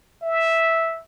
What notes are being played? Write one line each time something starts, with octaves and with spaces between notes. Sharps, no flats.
E5